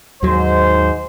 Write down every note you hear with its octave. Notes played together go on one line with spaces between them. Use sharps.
D#2 G#2 F#3 C5